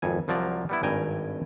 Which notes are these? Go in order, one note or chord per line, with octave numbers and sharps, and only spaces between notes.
G#1 F2 G#5
C2 F3 F#3 D5 A#5
G3 B3 E4
G#1 G2 G5 G#5 A#5